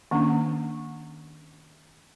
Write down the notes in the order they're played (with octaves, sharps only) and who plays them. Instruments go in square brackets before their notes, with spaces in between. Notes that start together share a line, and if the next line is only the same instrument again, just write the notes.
[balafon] D#3 A#3 C#4 D4